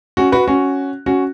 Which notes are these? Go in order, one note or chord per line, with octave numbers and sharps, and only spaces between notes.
C#4 F#4
F#4 B4
C#4 F#4
C#4 F#4